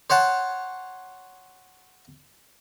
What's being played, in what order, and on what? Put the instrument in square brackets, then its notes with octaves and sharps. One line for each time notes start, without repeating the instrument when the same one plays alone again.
[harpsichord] C5 C#5 F#5 A5